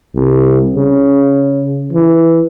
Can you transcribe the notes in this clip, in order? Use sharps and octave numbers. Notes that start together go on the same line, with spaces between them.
C2
C#3
E3